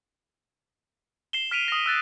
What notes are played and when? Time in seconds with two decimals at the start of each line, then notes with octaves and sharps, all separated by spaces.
1.33 C7 E7 G7
1.51 F6 B6 D7 D#7 F7
1.68 D#6 A#6
1.86 E6 F#6 A6